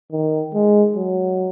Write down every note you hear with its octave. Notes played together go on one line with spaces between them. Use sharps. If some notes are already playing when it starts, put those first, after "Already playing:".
D#3
G#3
F#3